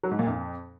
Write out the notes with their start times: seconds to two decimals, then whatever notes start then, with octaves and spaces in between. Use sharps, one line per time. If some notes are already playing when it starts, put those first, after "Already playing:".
0.03 F#3
0.11 G#2
0.19 A#2
0.27 F2